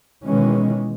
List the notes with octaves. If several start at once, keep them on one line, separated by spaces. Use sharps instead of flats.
B2 D#3 E3 G#3 C#4